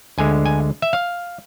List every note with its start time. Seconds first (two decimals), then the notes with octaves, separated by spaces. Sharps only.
0.18 D2 D3 G#3 G#5
0.46 G#5
0.82 E5
0.93 F5